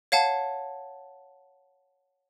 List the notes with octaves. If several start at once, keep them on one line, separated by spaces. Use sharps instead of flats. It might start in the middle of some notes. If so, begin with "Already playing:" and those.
C#5 F5 F#5 A5